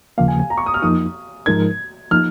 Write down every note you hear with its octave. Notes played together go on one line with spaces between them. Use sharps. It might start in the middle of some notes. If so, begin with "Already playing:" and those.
D#2 C#3 F3 A#3 F5
G#5
G#5
A#5
C#6
D#6
F6
F2 F3 A#3 D#4 D#6
G#2 F3 G#3 D#4 A#4 G#6
F3 A#3 D#4 F6